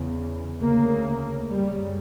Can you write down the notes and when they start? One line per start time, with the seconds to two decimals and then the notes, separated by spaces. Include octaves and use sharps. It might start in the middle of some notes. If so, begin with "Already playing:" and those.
Already playing: E2 C#3
0.60 D2 C#3 A#3
1.52 F#2 C#3 G3